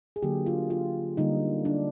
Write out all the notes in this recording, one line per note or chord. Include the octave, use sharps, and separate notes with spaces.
G#4
D3 F#3 A#3 G4
F4
F4
D3 G3 A#3 D#4
D4